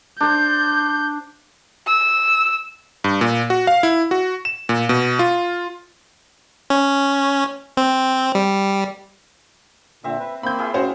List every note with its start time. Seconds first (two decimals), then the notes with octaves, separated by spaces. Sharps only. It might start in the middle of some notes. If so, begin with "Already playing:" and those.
0.20 D4 C5 G6
1.87 E6
3.04 G2
3.21 A#2
3.50 F#4
3.67 F5
3.83 E4
4.11 F#4
4.45 E7
4.69 A#2
4.89 B2
5.19 F4
6.70 C#4
7.77 C4
8.35 G3
10.04 A#2 D3 C4 E5
10.19 B4
10.43 A#3 C4 B5 G6
10.58 E4 F4 G#4
10.74 A2 C4 C#4 F#4 C5